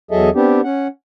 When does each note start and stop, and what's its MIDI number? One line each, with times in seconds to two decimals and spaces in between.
0.11 0.30 40
0.11 0.30 54
0.11 0.30 68
0.11 0.30 69
0.11 0.30 75
0.11 0.30 76
0.35 0.61 59
0.35 0.61 60
0.35 0.61 62
0.35 0.61 67
0.64 0.87 61
0.64 0.87 78